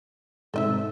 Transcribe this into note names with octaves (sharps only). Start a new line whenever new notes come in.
G#2 C3 A4 D#5 E5